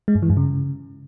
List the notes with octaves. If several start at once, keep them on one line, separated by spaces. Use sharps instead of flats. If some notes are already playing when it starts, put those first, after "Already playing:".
G#3
G2
E3
G2
C#3